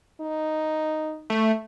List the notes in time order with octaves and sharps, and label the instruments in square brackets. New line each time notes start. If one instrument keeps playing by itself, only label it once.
[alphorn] D#4
[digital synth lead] A3